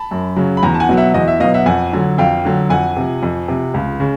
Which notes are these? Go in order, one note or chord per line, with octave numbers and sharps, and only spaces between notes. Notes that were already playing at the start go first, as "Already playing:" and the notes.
Already playing: A5 B5
F#2
C#3 F#3
B5
E2 G#5 A#5
A5
F#5 G#5
B2 F#3
E5 F#5
E2 D#5
E5
B2 F#3 D#5 F5
E5 F#5
F2 F#5 G#5
D3 F#3
F2 F5 G5
D3 F#3
F2 F#5 G#5
C3 F3
F2
C3 F3
C#2
C#3